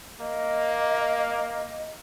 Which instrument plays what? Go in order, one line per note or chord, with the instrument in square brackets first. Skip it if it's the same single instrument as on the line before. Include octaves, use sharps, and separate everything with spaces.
[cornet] A#3 [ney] D#5